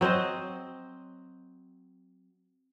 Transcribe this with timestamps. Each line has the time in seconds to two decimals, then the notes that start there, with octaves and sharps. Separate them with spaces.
0.01 F#3 C4 C5 D#5